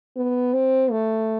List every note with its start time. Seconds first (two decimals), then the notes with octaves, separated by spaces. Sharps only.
0.17 B3
0.54 C4
0.91 A3